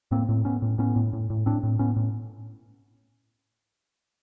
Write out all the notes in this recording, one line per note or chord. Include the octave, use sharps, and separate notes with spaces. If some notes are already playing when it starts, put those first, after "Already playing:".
A2 A#3 C4
A2
A2 B3 C#4
A2
A2 B3 C#4
A2
A2
A2
A2 C4 D4
A2
A2 B3 C#4
A2